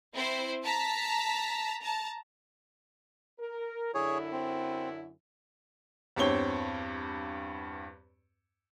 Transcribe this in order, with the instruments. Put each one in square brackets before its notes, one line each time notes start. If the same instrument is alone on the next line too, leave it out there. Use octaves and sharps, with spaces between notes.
[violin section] C4 E4 C5
A5 A#5 B6
A5 A#5
[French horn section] A#4
[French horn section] F#2 D3 E4 [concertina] G#4 C#5
[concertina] C4
[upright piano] E2 G2 C4 C#5 G7